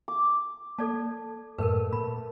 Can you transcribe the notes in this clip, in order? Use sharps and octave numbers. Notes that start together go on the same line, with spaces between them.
D6
A#3 A4 D5 A5
F#2 A2 A3 A#4 B4 E6
A#2 B5